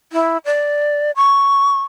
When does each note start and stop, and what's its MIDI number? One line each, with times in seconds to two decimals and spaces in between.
0.13 0.37 64
0.45 1.11 74
1.16 1.80 85